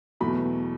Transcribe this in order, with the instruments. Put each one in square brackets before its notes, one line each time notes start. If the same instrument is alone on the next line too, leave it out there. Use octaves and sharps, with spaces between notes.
[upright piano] E2 B2 F#3 A3 B5